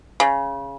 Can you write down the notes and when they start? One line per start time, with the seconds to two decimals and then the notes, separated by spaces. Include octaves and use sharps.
0.20 C#3